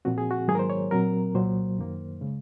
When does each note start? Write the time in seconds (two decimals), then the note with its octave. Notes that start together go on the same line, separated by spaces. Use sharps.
0.05 A#2 F3 C4 F#4
0.18 G#4
0.31 F#4
0.48 G#2 D#3 F#3 A#3 G#4
0.55 A#4
0.59 C5
0.70 C#5
0.91 A#2 F#3 C4 A#4
1.35 C2 A#2 F#3 A#3 C5
1.78 F#2 D#3 A#3
2.21 C#3 G#3